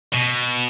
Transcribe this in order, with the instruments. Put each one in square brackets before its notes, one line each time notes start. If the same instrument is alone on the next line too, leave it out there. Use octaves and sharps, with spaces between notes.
[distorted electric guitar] B2